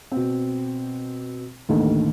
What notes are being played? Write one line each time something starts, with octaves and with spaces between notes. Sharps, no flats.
B2 C4
A1 D#2 D3 D#3 A4